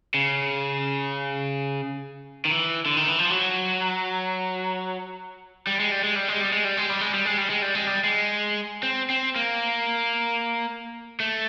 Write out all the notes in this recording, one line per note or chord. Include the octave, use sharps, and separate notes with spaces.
C#3
D#3
E3
D3
D#3
E3
F3
F#3
G3
G#3
G3
G#3
G3
G#3
G3
G#3
G3
G#3
G3
G#3
G3
G#3
G3
G#3
G3
G#3
G3
G#3
C4
C4
A#3
A3